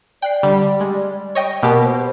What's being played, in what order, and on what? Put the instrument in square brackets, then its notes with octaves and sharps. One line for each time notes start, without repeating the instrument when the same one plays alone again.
[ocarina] D5 [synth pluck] G5 F#6 C7
[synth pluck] D3 [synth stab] G3
[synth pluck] G#3
C#5 D#5 G5
[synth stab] B2 [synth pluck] A#3 G4 [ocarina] A#4
[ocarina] C5